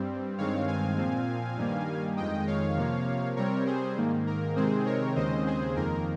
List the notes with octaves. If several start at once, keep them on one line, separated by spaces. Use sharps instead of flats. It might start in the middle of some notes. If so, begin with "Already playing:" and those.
Already playing: G2 G3 C4
G2 D#3 G#3 C4 C#5 F5
F5 G#5
A#2 F3 C4
G2 D#3 G3 A#3
F2 D#3 G#3 D#5 G5
C#5 F5
C3 F3 A#3
C3 G3 C4 A#4 C#5
G#4 C5
G#2 D#3 A#3
A#4
C3 D#3 G#3 C4 G#4 C5
A#4 C#5
D#2 C#3 G#3 C4 C5 D#5
G#4 C5
F2 D#3 A#3 A#4